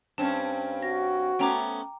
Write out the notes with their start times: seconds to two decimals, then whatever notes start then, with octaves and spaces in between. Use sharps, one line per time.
0.18 G2 C4 C#4 A5
0.82 F#4 A#6
1.39 A3 B3 C#4 G5 A#5 D6